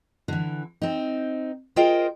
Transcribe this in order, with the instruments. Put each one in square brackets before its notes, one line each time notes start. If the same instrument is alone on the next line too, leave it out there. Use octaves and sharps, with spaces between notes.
[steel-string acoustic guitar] D3 E3
C4 D#4
F4 G#4 A#4 C5 D#5 G5